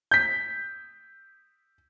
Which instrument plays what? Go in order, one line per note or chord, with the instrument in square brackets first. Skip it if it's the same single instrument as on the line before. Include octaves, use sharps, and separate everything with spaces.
[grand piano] G6 B6